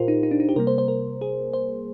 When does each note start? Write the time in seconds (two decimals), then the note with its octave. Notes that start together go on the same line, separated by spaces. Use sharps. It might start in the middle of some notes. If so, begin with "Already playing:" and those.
Already playing: A#2 F4 G4 A#4 C5
0.08 D#4
0.23 D#4
0.31 D4
0.40 D#4
0.49 G4
0.56 C3 G3 A#3 A#4
0.67 C5
0.78 C5
0.88 A#4
1.21 G#4
1.53 C5